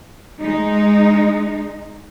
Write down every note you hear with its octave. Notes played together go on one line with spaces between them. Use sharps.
G#3 D#4